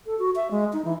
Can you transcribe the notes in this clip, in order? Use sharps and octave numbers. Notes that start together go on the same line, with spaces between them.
A4
F#4
E5
G#3
D#4
E3